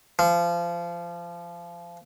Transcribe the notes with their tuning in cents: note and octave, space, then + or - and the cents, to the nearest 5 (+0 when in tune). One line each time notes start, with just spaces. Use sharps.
F3 -25